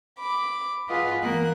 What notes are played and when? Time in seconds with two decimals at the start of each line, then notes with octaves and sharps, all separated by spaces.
0.19 B5 D6
0.89 F4 G#4 B4 D#5 F5 F#5
1.22 E3 A#3 F#6